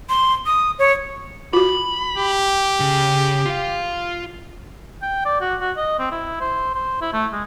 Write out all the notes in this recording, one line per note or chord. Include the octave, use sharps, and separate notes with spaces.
C6
D#6
C#5
F4 F#4 B5
G4
C#3
F4 F5
G5
D5
F#4
F#4
D#5
C4
E4
C5
C5
E4
A3
G#3